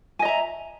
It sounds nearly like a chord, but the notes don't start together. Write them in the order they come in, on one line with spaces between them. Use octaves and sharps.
G#5 D#5 A#5 E5